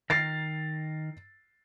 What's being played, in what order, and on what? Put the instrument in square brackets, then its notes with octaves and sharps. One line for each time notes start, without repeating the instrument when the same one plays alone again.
[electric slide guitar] D#3 A#4 [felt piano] A6 C7